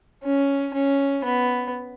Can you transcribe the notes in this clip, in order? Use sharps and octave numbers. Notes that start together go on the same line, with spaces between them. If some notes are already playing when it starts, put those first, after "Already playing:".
C#4
C#4
B3